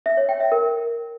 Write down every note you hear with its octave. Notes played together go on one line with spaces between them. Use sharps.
E5
C#5
G5
E5
A#4